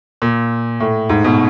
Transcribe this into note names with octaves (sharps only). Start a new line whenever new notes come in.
A#2
A2
G#2
B2